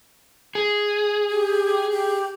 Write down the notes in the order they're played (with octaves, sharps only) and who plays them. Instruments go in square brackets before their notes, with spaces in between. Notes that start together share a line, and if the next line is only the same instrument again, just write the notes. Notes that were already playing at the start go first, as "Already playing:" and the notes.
[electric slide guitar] G#4
[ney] G4
G4